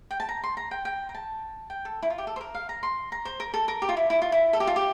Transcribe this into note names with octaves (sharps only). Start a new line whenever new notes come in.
G5
A5
A#5
C6
A#5
G5
G5
A#5
A5
G5
A4
E4
F4
G4
A4
C5
A#4
F5
A#5
C6
A#5
C5
A#4
A4
A#4
G4
F4
E4
E4
F4
E4
A4
G4
F4
G4